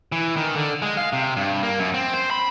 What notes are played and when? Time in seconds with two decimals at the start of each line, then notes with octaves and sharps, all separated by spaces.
0.12 E3
0.36 D#3
0.55 D3
0.82 G#3
0.97 F5
1.13 C3
1.36 G2
1.63 A#3
1.79 F#2
1.94 C4
2.14 C5
2.31 B5